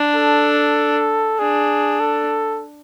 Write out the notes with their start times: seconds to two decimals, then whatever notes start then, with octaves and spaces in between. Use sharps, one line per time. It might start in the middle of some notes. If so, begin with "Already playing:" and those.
Already playing: D4
0.16 A4
1.39 D4 G#4
2.00 A4